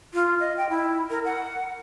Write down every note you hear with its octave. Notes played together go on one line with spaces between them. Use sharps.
F4
D#5
G5
E4
A#4
F#5